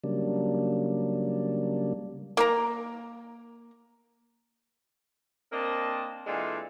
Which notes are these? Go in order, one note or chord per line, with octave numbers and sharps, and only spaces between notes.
C#3 F#3 G3 A#3 D4
A#3 A#4 A#5
A#3 C4 D4 A#4 D#5 A5
A#2 E3 G#3 D4 A4